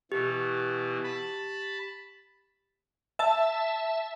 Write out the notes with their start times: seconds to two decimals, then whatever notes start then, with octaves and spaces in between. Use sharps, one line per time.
0.12 B2 E3 G4
1.04 A5 B5
3.19 E5 A5